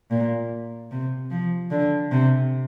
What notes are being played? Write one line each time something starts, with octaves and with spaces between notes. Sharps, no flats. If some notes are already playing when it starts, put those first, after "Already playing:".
A#2
C3
F3
D3
C3